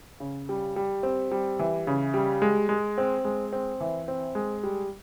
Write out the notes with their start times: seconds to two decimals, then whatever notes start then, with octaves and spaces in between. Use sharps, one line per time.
0.20 C#3
0.49 G3
0.76 G3
1.03 C4
1.31 G3
1.59 E3
1.87 C#3
2.14 G3
2.42 G#3
2.69 G#3
2.98 C4
3.25 G#3
3.53 C4
3.81 E3
4.08 C4
4.35 G#3
4.63 G3